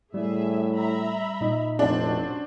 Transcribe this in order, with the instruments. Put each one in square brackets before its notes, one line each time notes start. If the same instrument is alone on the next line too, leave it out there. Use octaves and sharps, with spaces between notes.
[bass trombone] A2 [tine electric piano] G3 [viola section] G#4 E5
[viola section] E5 A#5 B5
[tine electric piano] A#2 D#4 D#5
[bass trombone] F1 [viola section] F#3 C#4 C5 [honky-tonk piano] D4